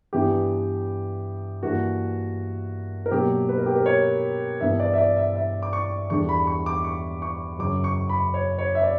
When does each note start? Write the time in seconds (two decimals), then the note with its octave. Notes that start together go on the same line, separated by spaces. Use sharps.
0.13 G2 E3 B3 D4 G4
1.63 G2 E3 A#3 F#4
3.06 A#4
3.11 B2 F#3 A#3 D4 G4
3.49 B4
3.58 A#4
3.66 G4
3.75 A#4
3.86 C#5
4.60 G2 E3 B3 E5
4.80 D5
4.94 E5
4.98 D5
5.17 E5
5.36 E5
5.63 D6
5.73 C#6
6.10 E2 D3 G3 B3 D4 C#6
6.29 B5
6.47 C#6
6.66 D6
6.84 C#6
7.22 C#6
7.59 F#2 C#3 F#3 D6
7.84 C#6
8.09 B5
8.34 C#5
8.58 C#5
8.75 E5
8.83 D5